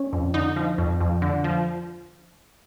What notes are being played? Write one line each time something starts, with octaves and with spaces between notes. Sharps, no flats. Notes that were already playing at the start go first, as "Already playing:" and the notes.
Already playing: C#4
F2
D3 D#4
F3
F2
F2
D3
F3